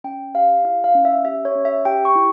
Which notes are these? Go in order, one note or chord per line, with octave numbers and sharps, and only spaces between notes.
C#4 G5
G4 F5
E4 F5
F5
C#4
E5
G4 E5
C#5
C#4
E5
G4 G5
C#6
E4